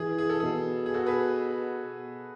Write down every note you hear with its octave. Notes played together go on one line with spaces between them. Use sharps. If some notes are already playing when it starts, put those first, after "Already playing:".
Already playing: E3 G#4
G#4
A4
B2 G#4
G#4
F#4 A4
G#4 B4